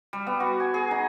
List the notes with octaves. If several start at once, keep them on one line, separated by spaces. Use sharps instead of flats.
G3
B3
F#4
G#5
G#4
D#4